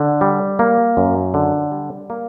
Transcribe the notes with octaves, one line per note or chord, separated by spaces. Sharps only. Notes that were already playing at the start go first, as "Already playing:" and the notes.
Already playing: D3
G3
A#3
F#2
D3
G3
A#3